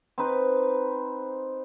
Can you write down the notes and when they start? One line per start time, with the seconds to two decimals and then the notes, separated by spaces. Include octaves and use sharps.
0.18 C4 D#4 B4